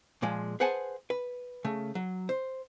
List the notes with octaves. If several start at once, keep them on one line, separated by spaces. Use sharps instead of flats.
A#2 F3 G#3
G#4 B4 C5 F#5 G#5 A5
B4
C#3 A3
F#3
C5